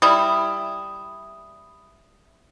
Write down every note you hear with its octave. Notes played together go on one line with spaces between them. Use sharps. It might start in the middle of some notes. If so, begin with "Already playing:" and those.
G3 E4 D#6